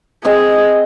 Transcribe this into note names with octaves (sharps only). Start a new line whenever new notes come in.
C4 G#4 D#5